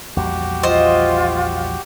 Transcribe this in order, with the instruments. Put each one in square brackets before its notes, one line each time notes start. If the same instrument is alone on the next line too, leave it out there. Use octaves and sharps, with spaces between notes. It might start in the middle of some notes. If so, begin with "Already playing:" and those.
[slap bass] A#1 E2 G3 [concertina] F#4 G4
[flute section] F4 [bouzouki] C5 D#5